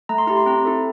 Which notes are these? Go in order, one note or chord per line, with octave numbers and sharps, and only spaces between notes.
A3 A#5
C6
E4 G4 A#5
C6
C4 A#5
E4 A4